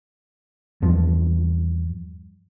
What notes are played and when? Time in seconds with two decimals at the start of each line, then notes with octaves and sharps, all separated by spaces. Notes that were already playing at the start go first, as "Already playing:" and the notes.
0.82 E2 G2 F3